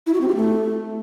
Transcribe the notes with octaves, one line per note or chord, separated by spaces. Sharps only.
E4
F#4
C4
G4
A3